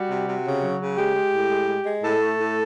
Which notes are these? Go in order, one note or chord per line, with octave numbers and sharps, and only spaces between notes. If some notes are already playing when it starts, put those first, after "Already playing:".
Already playing: G3 F#4
C3
C3
C#3
F#3
C#3
G#3 G4
G#3
A2
G#3
G#3
G#3
A2 A4
A3
A2